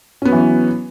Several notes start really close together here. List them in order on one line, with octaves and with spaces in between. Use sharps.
C#4 B3 F#3 E3